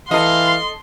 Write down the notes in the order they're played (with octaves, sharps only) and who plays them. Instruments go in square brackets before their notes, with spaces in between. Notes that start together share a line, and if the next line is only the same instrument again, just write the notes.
[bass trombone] E3 [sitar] A4 D#5 [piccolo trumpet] F5 [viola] C6